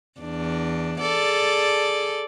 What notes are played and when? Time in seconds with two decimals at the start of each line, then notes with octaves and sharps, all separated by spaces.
0.20 E2 D4
1.00 G#4 A4 D5